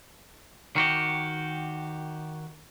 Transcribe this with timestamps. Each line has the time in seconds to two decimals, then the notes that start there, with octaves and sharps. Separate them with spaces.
0.76 D#3 F#4 G4